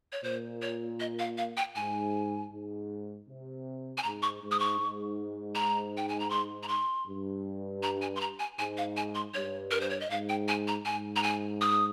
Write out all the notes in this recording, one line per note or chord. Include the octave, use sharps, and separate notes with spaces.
C#5
A#2 C5
C#5
D#5
F5
F5
G5
G#2 G#5
G#2
C3
G#5
G#2 A#5
C#6
G#2
D#6
C#6
G#2
A#5
G5
G#5
A#5
C6
A#5
C6
G2
A#5
G#5
C6
A#5
G#5
G#2 G#5
F5
G#5
C6
G2 C#5
A#4
C5
C#5
D#5
G#2 F5
G5
G#5
A#5
G#2 G#5
A#5
G#5
D#6